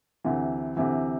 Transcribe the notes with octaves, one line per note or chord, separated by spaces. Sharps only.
D2 C3 E3
D2 C3 E3